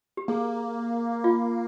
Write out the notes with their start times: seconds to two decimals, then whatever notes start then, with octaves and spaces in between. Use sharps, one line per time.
0.17 G4
0.28 A#3 G#4
1.24 F4